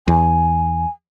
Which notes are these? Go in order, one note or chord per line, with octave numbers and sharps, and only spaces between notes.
E2 G#5